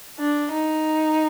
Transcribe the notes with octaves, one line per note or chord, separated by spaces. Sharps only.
D4
D#4